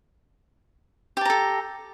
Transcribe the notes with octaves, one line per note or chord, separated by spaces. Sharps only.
G4 A4 A5 A#5